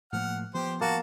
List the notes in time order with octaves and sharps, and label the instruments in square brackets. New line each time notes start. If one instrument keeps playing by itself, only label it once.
[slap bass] A2 F3 A#3 [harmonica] F#5 F6
[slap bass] F3 B3 [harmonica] G4 C5
[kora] A#3 [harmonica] F#4 A5